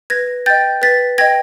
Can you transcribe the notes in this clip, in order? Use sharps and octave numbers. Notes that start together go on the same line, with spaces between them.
B4 G#6 A#6
D#5 G5 G6 A6
B4 A6 B6
D#5 G5 G#6 A#6